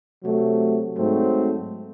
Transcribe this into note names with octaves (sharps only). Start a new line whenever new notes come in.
C3 F#3 A3
G#2 F#3 A3 C4